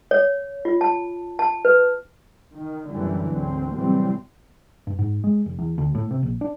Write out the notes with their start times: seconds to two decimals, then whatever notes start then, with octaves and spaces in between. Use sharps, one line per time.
0.11 C#5
0.65 F4
0.81 A5
1.39 A5
1.65 B4
2.56 D#3
2.90 B1 F#2 D3 E3 G3 A3
3.28 D2 G#2 F#3 C4
3.75 A2 C3 E3 F#3 G3 C4
4.87 G2
4.99 G#2
5.24 G#3
5.46 F1
5.59 E2
5.78 D2
5.95 A2
6.11 C3
6.23 A#1
6.41 D4